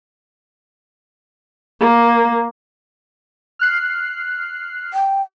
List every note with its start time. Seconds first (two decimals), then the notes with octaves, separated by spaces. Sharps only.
1.80 A#3
3.59 F6 F#6 C7
4.93 G5